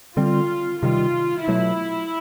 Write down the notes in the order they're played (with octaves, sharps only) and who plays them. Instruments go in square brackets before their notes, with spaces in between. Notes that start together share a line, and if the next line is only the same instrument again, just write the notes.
[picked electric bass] D3 G3 C4 [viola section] F4
[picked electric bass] C3 D#3 G3 [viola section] F4
[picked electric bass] B2 F#3 A3 [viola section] E4